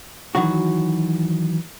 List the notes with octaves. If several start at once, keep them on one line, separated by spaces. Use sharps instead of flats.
D#3 E3 F#3 F#4